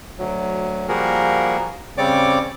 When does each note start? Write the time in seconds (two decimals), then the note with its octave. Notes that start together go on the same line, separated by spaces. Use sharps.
0.18 D2 F#3
0.88 F3 G3 A#3 F#4 G#4 A#4
1.97 C#3 G3 C4 C#5 D5 D6